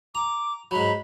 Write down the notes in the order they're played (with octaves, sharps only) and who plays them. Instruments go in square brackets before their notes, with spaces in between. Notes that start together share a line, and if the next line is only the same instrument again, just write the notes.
[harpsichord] A#5 [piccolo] D6
[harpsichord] G#2 F#3 [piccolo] B5